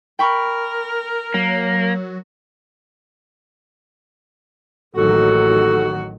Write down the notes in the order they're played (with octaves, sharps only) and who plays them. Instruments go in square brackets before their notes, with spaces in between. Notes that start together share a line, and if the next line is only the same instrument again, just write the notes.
[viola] A#4 [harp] G5 B5 C#6
[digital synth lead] F#3 [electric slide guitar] A#3
[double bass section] A1 D#3 F#3 [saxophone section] D#2 F#4 [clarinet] A4